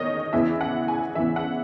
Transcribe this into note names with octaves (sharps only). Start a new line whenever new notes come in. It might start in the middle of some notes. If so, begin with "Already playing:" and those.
Already playing: E2 D#3 C#5 D#5
E2 C#3 E3 E5
F#5
G#5
E2 C#3 E3 E5
F#5